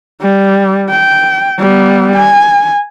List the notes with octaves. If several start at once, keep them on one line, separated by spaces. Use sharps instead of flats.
G3
G5
G3 B3
G#5